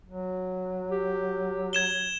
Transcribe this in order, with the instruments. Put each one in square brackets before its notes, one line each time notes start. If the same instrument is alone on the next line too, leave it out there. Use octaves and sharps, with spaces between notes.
[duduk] F#3
[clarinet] G4
[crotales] G#6 E7 G7